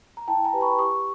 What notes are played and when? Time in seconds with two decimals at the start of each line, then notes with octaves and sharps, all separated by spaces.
0.17 A#5
0.28 E4 G5 A5
0.44 G#5 A#5
0.53 G4 B4
0.61 B5 C#6
0.78 G4 C#6 D#6